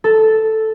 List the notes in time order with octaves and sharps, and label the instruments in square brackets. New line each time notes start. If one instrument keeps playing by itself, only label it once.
[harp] A4